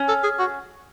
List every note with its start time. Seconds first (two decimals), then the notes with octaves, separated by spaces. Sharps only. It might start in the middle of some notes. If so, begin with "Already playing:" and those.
Already playing: C#4
0.08 A4
0.23 G#4
0.39 F#4